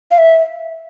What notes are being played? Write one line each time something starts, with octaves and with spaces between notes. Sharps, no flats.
F5
E5